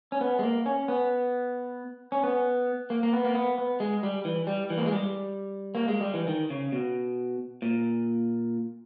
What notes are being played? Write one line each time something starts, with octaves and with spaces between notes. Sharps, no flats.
C#4
B3
G#3
A#3
C#4
B3
C#4
B3
A#3
A#3
B3
A#3
B3
B3
G#3
G3
E3
G3
E3
A#3
G#3
G3
A#3
G#3
G3
E3
D#3
C#3
B2
A#2